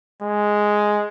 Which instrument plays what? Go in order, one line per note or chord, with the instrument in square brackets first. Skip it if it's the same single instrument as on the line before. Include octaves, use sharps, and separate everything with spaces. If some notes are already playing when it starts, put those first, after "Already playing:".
[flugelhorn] G#3